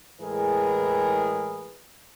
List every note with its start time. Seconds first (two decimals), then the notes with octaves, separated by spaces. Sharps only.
0.21 A2 E3 G#3 G#4 A#4 B4